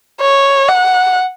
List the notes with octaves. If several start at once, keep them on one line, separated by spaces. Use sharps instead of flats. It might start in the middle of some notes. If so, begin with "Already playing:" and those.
C#5
F#5